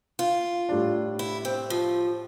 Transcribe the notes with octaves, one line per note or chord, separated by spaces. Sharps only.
F4
A2 G3 D4
E4
C4
F3